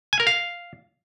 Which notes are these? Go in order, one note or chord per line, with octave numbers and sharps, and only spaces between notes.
G#5
A#4
F5